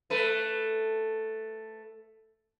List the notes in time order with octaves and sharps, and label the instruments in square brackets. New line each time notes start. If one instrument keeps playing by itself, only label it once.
[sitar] A3 B4